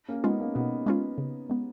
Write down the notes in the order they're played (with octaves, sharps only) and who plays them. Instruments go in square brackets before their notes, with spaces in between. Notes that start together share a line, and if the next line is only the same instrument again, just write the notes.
[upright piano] A#3 C#4
[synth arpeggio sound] G#3 C#4 F4 [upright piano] B3 D#4
[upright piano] A#3 C#4
[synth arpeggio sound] B2 [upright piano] B3 D#4
[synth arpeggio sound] G#3 C#4 F4
C#3
G#3 B3